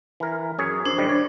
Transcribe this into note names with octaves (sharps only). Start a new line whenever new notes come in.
E3 A#4
F#2 G#4 C#5
F#2 D4 C5
A2 D#3 G3
C#5 D5